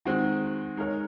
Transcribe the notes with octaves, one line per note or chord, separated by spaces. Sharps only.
D#3 G#3 C4 D#4 F#4
G#3 D#4 A#4 C#5